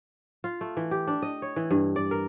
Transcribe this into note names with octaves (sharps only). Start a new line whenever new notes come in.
F4
A3
E3
G4
D4
D#5
C#5
E3
G2
D5
A#4